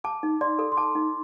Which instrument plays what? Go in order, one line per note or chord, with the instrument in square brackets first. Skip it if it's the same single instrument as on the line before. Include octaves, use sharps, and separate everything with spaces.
[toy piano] A5 [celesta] D6
[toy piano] D#4
[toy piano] D5 [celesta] C6
[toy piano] A4
[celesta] C6
[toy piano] A5 [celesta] D6
[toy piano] D#4